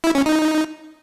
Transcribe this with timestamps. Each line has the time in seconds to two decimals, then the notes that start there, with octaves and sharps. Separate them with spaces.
0.04 E4
0.15 C#4
0.26 D#4